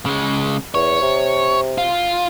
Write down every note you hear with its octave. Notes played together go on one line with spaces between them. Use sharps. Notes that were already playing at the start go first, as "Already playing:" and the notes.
C#3 G#3
E2 C#5
C3
F4